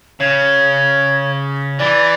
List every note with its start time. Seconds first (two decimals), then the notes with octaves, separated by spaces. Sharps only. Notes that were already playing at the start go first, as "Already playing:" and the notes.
0.20 C#3 C#5
1.79 E3 D5